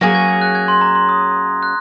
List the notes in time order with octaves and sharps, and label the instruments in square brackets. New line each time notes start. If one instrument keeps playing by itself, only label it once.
[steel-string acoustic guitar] F#3 A#3 C#4 G#4 [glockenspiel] A#6
[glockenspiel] G#6
G#6
F#6
G#6
C6
A#5
C6
D#6
F#6